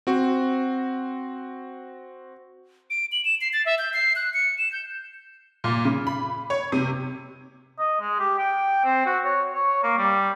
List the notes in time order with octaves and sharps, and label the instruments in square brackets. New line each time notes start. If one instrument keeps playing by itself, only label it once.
[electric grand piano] C4 F#4
[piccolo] D7
F#7
E7
C7
A6
E5
G6
C7
F#6
C#7
E7
G6
[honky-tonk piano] A#2
C#3
B5
C#5
C3
[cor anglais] D#5
G#3
G4
G5
C4
F#4
C#5
C#5
A#3
G3